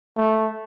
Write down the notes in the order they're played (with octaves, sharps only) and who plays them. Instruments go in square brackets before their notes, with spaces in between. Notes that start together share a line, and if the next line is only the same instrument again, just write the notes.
[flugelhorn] A3